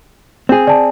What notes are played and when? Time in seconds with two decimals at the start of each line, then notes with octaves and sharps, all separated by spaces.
0.49 C4 G#4
0.67 D5 A5